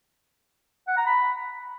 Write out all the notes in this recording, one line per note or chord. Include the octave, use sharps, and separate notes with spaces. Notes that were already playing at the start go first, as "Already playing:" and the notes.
F#5
A#5
B5